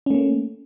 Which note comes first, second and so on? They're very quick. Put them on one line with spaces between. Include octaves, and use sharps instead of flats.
C#4 A3 A#3